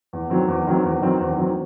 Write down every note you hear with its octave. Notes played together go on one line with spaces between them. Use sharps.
E2
D#3 F#3 C4
E2
D#3 F#3 C4
E2
D#3 F#3 C4
E2
D#3 F#3 C4